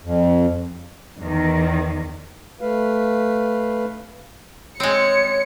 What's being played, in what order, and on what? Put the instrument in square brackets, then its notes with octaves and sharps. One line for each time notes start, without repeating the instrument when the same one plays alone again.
[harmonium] F2
[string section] E2 D#3
[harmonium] A3 B4 F5
[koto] G#3 C4 [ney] C#5 [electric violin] C#7